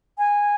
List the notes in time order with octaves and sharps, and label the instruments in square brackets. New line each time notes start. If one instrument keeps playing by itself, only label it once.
[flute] G#5